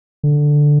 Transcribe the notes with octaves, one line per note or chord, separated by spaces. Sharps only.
D3